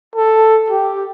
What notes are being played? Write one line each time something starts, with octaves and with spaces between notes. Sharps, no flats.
A4
G4